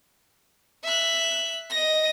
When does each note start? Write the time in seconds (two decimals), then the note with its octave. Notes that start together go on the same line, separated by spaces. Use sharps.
0.84 E5 F#6
1.70 D#5 A#6